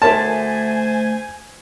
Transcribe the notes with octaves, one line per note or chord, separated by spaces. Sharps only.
D2 A3 A#4 C5 C#5 G#5 A5 C6